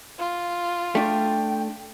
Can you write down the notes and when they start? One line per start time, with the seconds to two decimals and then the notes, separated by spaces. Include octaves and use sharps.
0.18 F4
0.95 A3 D4 G5